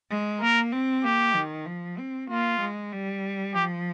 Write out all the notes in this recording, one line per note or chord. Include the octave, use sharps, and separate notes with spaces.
G#3
A#3 A#4
C4
A#3 G4
D#3
F3
C4
A#3 F4
G#3
G3
F3 G4